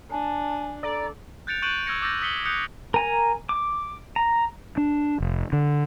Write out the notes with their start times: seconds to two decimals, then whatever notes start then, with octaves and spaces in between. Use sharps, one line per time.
0.11 D4 G#5 A5
0.83 A4 D5 A#5
1.47 F#6 G6 A6 C#7 D7 F7
1.62 C#6 F#6 G6 D7 D#7 F#7
1.86 C#6 E6 F6 G#6 A#6 C#7
2.02 D6 E6 G6 A6 A#6
2.22 D#6 B6 C#7 F#7 G7
2.45 D#6 F#6 G6 C#7 F7
2.94 A#4 G#5 A#5
3.49 D6
4.16 A#5
4.77 D4
5.20 F1
5.53 D3